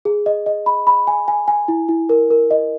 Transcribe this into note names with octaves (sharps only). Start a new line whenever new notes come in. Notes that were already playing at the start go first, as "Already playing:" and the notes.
G#4
D#5
D#5
B5
B5
G#5
G#5
G#5
E4
E4
A#4
A#4
D#5